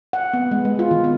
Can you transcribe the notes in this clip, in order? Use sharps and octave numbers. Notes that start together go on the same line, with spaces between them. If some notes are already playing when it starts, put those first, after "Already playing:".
F#5
B3
G#3
G#3
F4
D#3
B3